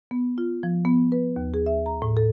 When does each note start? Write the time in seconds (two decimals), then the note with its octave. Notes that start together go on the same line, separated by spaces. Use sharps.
0.11 B3
0.38 F4
0.63 F3
0.85 B3
1.12 B4
1.36 D#2
1.54 G#4
1.66 E5
1.86 A#5
2.02 A2
2.17 A4